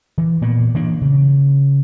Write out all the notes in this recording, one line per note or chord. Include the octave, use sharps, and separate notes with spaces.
E3
A#2 A#3 B3
E3 A#3 D4
C#3